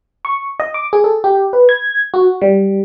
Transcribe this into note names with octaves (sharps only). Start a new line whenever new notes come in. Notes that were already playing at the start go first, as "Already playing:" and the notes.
C#6
D#5
D6
G#4
A4
G4
B4
G#6
F#4
G3